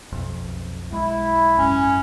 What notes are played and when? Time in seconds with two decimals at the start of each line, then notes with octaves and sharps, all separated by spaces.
0.12 B1 F2
0.92 B1 G#3 E4
1.58 G#1 F#2 C#4